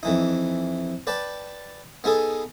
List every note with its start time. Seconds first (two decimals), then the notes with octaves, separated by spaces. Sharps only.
0.03 F2 E3 D#4
1.07 B4 D5 G5 A5
2.04 B3 D#4 G#4 A4